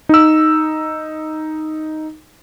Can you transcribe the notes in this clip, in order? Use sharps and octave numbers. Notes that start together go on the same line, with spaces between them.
D#4 E6